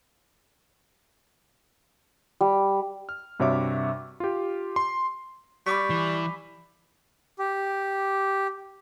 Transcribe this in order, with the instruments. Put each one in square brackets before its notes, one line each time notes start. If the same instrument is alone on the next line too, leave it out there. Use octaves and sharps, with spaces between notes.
[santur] G3
[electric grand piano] F6
G2 C3 F#4 C#5 E5 D6
F4 G4
C6
[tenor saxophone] G3 [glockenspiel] B5 D6 B6 [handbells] C#6
[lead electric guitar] E3
[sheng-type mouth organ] G4